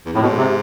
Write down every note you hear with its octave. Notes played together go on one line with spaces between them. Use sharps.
E2
F2 A2
G#2 B2
C3